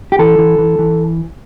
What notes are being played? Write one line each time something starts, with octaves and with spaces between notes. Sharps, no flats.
G4
E3 A4
E3
E3
E3